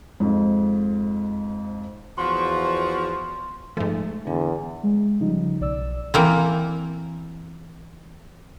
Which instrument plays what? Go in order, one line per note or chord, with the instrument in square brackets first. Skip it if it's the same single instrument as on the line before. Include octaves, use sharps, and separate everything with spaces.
[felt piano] F2 G#2
[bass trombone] E2 [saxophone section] F3 [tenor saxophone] F#4 [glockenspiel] C6
[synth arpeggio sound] G#2 F3 [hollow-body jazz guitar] A3
[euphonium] E2 [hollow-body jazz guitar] D3
[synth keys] G#3
C#3 F3 G3 D#4
B1 D5 E6
[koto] E3 A#3 C4